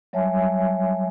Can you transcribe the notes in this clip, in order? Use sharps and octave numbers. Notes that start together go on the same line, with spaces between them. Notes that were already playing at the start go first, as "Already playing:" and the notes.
F#3 G3 C#5 E5 G#5 A5